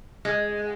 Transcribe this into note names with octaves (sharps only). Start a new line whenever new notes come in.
G#3